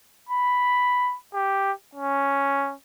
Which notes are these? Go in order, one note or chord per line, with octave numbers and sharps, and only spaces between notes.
B5
G4
C#4